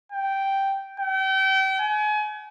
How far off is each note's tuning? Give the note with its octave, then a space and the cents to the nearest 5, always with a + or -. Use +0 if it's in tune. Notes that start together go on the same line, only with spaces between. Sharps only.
G5 -5
G5 -35
G#5 +30